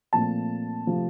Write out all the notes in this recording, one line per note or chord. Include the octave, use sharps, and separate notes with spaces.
A#2 F3 A3 C4 A5
C3 F3 A3